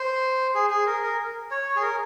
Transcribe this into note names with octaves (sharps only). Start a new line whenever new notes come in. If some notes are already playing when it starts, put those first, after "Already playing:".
Already playing: C5
G#4
G#4
A#4
A#4
C#5
G#4
A#4